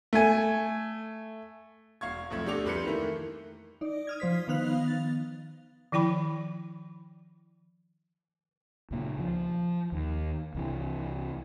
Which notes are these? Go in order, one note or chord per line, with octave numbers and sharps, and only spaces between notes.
A3 G#5
E1 F5 C#6 G#6
B1 F2 A3 G#6
D2 D4 G4 A4 D6 F7
F2 G3 B4 C6 G6 C#7
D#3 E3 A3 A#3
D#4 D5
D#6 F6 G#6
F3 C5 B6
D#3 B3 D#4 F5 F#6 F7
A6
D#3 F3 E4 G5 B5
C#2 A#2
F3
D#2
C2 E3